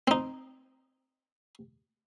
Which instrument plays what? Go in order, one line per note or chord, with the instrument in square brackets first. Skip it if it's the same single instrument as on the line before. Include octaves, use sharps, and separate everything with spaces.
[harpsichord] C4 D#4